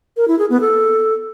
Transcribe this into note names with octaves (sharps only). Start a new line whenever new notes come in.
A#4
E4
G#4
B3
A4